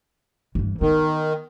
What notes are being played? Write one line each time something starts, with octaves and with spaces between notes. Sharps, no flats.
G2 E3
D#3 B3